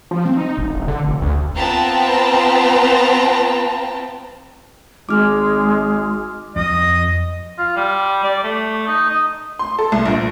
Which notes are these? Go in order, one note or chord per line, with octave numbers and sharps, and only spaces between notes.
F3
C4
D#4
E1
E1
D3
F1
D2
B3 C4 F4 G5 A5 A#5
G#1 G#3 D6 F6
F2 D#5
F4
G3
D5
A3
D#4
D#5
C6
A4
C2
A#1